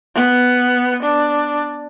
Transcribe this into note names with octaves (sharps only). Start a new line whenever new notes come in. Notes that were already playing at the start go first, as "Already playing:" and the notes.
B3
D4